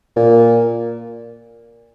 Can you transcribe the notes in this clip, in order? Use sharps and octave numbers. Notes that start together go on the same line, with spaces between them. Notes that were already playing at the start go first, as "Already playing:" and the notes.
A#2